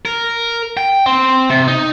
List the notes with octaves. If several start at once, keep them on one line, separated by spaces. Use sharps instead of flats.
A#4
G5
C4
C3
D#4